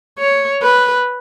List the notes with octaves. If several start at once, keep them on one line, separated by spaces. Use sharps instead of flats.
C#5
B4